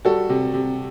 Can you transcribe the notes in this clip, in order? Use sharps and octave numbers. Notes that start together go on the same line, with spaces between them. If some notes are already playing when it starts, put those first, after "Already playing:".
G3 F#4 A4
C3
C3